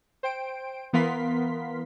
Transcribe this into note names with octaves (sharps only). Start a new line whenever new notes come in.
C5 G5 D7
E3 B3 A#4 F5 C6 B6